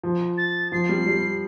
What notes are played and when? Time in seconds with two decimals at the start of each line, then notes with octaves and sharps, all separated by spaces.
0.03 F3
0.38 A6
0.72 F3 C7
0.89 G3
1.06 G3